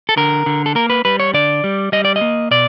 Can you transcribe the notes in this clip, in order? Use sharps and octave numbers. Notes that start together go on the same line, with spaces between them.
A4
D3 A#4
D3
A4
A#3 A#4
B4
G3 B4
C#5
D3 D5
G3
G3 D#5
D5
D#5
A#3
B2 D5